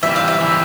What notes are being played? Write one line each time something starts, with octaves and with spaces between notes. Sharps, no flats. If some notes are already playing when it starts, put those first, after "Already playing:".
E3 G3 C4 E5
F5
E5
E3 G3 C4